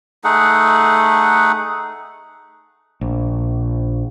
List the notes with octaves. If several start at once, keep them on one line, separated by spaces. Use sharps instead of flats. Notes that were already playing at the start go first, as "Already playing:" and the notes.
A3 D#4 G#4 F#5
A#1